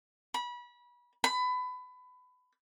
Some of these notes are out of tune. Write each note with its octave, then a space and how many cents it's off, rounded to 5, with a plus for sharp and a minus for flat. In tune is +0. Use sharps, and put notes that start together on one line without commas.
B5 -30
B5 +25